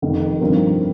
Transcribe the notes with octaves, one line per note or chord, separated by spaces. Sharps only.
F1 F2 D#3
G2 F3 C4 D#4 A#4